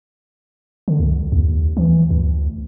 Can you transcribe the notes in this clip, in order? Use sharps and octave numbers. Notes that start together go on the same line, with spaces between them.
D3
C#2
D#2
E3
D2